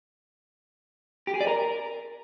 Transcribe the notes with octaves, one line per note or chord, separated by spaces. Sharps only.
G4
G#4
D5
A#4